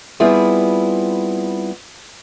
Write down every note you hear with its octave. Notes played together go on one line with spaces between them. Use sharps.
G3 B3 C4 E4 F4 G#4